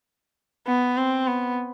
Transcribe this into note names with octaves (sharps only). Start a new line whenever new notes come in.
B3
C4
B3